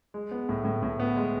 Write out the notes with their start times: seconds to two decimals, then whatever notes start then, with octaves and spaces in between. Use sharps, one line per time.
0.14 G#3
0.31 B3
0.49 A2
0.65 A2
0.83 A2
1.00 B3
1.17 G#3